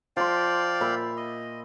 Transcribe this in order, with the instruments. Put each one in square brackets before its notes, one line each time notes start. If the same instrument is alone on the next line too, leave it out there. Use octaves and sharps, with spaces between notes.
[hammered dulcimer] F3 C6 [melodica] D5 F5 G5
[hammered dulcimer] A#2 E5 B5
[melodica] D#5